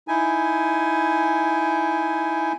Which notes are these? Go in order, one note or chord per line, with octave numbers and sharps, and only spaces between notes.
D#4 E4 G#5